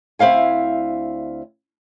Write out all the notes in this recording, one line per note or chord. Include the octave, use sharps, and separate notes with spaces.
D2 C4 E4 F5 G#5